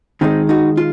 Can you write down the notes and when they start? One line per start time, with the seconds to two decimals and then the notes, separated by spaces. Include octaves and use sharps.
0.21 D#3 G#3 C4 D#4
0.49 D#4 F#4
0.77 F4